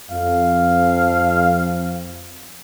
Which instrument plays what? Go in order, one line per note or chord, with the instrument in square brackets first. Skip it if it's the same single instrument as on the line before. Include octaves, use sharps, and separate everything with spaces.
[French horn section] F2 [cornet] F5